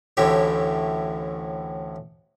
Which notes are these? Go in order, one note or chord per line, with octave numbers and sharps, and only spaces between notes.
A1 D2 A2 E4 G4 C#5